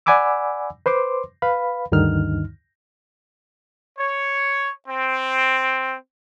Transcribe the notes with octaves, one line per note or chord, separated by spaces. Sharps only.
D5 F#5 G#5 B5 D6 E6
B4 C5 C6 D6
B4 F5 B5
D2 G2 D3 D#3 D#4 F6
C#5
C4